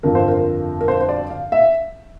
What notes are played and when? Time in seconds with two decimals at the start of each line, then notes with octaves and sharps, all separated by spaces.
0.03 G1 F2 D3 F3 A#4
0.15 C5
0.28 A#4
0.81 A#4
0.88 C5
1.01 C5
1.09 D5
1.30 F5
1.52 E5